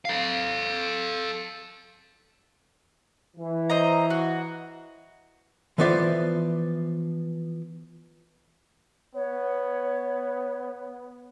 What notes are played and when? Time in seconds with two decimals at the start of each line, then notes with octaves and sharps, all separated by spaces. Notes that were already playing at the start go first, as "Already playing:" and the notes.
0.05 A4 F5
3.37 E3
3.70 C5 D#5 A#5
4.10 F#4
5.78 E3 F3 B3 C5 D5 E5
9.15 B3 C#5